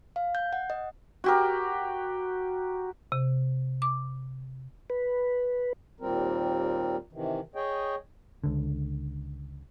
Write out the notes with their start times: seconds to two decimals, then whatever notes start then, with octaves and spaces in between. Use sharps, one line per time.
0.16 F5
0.35 G6
0.53 F#5
0.70 D#5
1.24 F#4 G4 A#4
3.12 C3
3.82 D6
4.90 B4
6.00 D#2 A#2 G3 C4 A#4
7.13 C3 D#3 E3
7.55 G#4 C#5 D#5 G5
8.44 C#2 D3